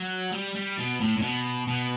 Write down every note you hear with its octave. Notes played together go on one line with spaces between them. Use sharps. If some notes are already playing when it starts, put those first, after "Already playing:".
Already playing: F#3
G3
G3
B2
A2
A2
B2
B2